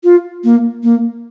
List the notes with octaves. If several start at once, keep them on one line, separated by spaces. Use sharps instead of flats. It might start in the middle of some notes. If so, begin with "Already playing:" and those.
F4
A#3
A#3